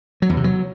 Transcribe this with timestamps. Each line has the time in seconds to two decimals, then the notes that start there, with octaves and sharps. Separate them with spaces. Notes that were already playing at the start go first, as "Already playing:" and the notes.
0.22 F#3
0.29 E2
0.37 C3
0.44 F#3